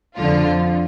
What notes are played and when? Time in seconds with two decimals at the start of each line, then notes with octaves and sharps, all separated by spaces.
0.18 F2 D3 F3 F4